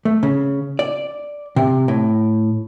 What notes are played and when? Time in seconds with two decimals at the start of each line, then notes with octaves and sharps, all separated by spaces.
0.05 A3
0.23 C#3
0.79 D5
1.56 C3
1.88 A2